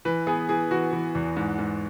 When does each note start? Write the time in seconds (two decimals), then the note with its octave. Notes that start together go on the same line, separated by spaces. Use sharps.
0.05 E3 B4
0.27 B3 G#4
0.49 E3 G#4
0.71 E3 F#4
0.93 E3
1.15 E2
1.37 G#2
1.59 G#2